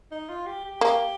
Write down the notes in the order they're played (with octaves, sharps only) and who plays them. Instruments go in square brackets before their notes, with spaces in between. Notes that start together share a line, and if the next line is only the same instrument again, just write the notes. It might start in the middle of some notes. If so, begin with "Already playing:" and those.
[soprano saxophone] D#4
F4
G4
G4
[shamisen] A#3 [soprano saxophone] G4